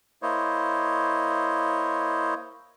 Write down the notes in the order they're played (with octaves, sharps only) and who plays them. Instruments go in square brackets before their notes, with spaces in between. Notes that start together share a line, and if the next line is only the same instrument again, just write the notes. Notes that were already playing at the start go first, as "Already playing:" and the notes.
[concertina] A#3 E4 C5 C#5 D#5